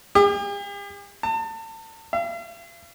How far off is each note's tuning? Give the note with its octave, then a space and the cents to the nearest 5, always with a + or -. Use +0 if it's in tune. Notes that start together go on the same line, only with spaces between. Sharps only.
G4 +45
A5 +35
F5 -45